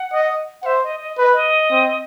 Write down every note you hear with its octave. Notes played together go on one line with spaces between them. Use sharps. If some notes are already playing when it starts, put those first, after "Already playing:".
Already playing: F#5
D#5
F#5
C5 E5
D#5
D#5
B4 D#5
D#5
C4